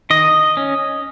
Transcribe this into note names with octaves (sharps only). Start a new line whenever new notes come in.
D#3 D#5
C#4